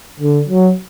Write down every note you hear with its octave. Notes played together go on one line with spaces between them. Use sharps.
D3
F#3